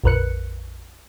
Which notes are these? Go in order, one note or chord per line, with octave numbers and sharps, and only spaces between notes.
A#1 F2 A#4 B4 F#6 C#7